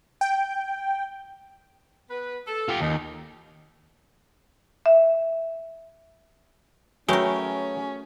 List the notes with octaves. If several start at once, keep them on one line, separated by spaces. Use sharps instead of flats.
G5
B3 B4
A4
F4 G4
D#2 C#4 D#4
E5
F#3 A3 C#4 F#4 G#4 A#4 B4 G5